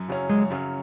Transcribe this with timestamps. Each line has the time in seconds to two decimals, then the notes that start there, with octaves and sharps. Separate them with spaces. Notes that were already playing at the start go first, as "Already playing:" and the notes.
Already playing: F#2
0.09 C#3 F#3 C#4
0.29 F#2 G#3
0.50 C#3 F#3 C#4